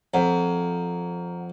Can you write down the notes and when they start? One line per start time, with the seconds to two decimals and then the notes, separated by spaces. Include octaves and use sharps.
0.14 F2 F#5 A#5